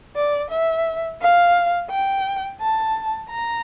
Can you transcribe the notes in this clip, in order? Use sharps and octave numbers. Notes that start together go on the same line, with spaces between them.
D5
E5
F5
G5
A5
A#5